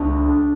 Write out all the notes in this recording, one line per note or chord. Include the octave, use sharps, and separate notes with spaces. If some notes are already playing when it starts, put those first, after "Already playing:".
Already playing: C#2 D4